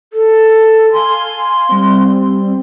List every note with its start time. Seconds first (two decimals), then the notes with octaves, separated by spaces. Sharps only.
0.13 A4
0.93 F5 G#5 C6
1.69 G3 C4